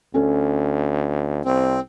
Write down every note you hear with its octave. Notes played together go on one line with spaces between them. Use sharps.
D2 C#4 A4
C2 C4